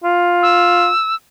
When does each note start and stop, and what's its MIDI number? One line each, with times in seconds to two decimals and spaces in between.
0.04 0.89 65
0.43 1.15 88